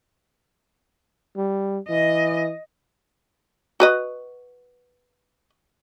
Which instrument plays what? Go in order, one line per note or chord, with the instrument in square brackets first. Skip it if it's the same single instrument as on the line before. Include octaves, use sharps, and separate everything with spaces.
[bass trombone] G3
[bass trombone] E3 [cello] D#5
[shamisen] F#4 B4 D#5